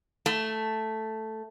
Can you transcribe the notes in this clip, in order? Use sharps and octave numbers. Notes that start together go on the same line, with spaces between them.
A3